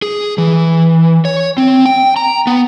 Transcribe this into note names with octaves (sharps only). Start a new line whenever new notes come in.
G#4
E3
C#5
C4
G5
A#5
B3